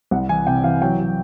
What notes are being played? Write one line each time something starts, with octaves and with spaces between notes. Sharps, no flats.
C2 F#5
E3 G#5
C3 G5
E3 F5
F#3 G5
F#3